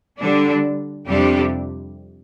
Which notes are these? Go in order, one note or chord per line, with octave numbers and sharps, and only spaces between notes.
D3 G3 D4
F2 C3 G3 D4 G4